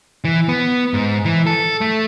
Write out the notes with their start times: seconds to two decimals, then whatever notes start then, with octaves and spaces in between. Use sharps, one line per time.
0.24 E3
0.49 B3
0.94 G#2
1.25 E3
1.47 A4
1.81 A3